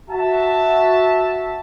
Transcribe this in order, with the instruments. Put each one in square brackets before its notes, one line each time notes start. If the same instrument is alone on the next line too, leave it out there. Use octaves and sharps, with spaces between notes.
[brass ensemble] F#4 E5 A5